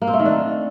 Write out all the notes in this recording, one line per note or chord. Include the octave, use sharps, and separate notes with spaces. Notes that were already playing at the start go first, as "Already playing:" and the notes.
A#3
C4
A3
D#3
D4